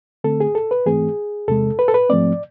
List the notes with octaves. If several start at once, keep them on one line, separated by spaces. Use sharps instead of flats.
D3 A3 C4 A4
G#4
A4
B4
G#2 E3 A3 C4 G#4
E2 C3 G#3 A4
B4
A4
B4
G#2 F3 A3 C4 D5